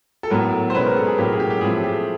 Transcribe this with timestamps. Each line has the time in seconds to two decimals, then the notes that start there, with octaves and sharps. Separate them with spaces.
0.23 A4
0.30 A2 F#3 B3 A#4
0.70 C5
0.75 B2 G#3 C#4 B4
0.86 A#4
0.96 A4
1.07 G#4
1.18 A2 F#3 A#3 C#4 G4
1.32 G#4
1.40 G4
1.50 G4
1.61 A2 F3 A3 C4 G#4
1.84 G4